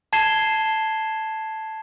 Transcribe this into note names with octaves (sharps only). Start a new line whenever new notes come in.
A5 G#6 C7 E7 G7